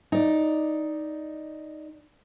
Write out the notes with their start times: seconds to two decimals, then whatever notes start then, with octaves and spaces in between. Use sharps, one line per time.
0.12 D#4 D5